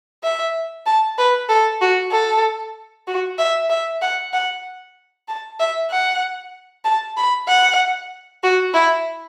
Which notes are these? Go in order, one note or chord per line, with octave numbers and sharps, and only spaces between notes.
E5
A5
B4
A4
F#4
A4
F#4
E5
E5
F#5
F#5
A5
E5
F#5
A5
B5
F#5
F#4
E4